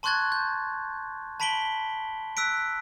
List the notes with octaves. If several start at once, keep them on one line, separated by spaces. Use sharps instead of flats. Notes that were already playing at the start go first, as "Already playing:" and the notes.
A5 C6 C#6 F#6 G#6 A6
G6
A5 B5 B6 D7 F#7 G7
E6 F#6 B6 D7